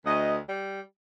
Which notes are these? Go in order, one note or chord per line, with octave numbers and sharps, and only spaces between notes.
D2 D#5
G3